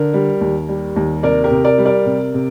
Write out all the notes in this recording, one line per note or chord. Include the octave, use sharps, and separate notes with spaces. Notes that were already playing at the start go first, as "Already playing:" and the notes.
Already playing: D3 A#4
G3
D#2
G3
D#2
C3 A#4 D5
G4 A#4
C3
A#4 D5
G3
A#4 D5
C3
C3